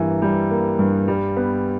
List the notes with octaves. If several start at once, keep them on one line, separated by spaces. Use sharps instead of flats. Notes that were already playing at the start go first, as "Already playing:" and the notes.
Already playing: G2 E3 G3 A#3
G3
A#3
G2
G3
B3